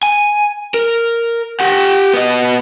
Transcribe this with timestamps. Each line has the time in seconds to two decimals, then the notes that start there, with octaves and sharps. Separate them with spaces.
0.03 G#5
0.74 A#4
1.60 G4 F#5
2.13 B3 D#5